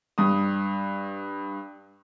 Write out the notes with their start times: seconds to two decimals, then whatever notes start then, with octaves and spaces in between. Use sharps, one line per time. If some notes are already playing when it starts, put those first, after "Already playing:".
0.18 G2 D#6